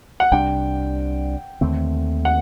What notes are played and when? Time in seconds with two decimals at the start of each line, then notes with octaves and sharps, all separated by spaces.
0.20 F#5
0.31 C2 C3 G3 D4 G5
1.61 D#2 D3 A3 C4
2.25 F#5